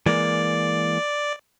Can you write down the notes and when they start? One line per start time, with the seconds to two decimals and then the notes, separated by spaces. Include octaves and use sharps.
0.06 E3 G#3 A#3 D5